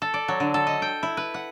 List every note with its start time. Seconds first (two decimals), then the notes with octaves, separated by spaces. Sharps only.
0.02 A4
0.14 D5
0.28 F#3
0.40 D3
0.54 A4
0.67 D#5
0.82 G5
1.03 E4
1.17 B4
1.34 F#5